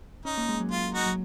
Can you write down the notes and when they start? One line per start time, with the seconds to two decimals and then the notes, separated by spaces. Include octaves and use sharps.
0.25 C#4 D#4
0.37 A#3
0.49 G#3
0.60 F#3
0.71 G#3 F4
0.83 G#3
0.94 D#4 F#4
1.06 F#3